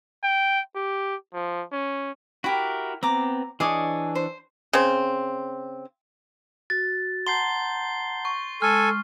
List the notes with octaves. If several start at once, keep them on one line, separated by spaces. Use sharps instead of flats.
G5
G4
F3
C#4
E4 F#4 G4 A#4
B3 C4 A#5 D6
E3 D4 G#4 C#5 D#5 D6
C5
C#3 C4
F#4 A6
F#5 A5 A#5 C6 G6 C7 G7
C#6
G#3 A4 G#5 F6